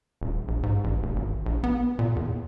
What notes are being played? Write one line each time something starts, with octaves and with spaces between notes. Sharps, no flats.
D#1
A#1
G#2
A1
F1
G#1
A#1
B3
A#2
E2